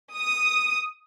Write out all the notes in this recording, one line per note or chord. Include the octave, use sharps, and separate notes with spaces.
D#6